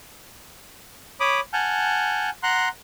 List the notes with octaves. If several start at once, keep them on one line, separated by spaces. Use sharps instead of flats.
C#5 B5 D6 D#6
F#5 G#5 A5 F6 G6
F#5 A#5 C6 F#6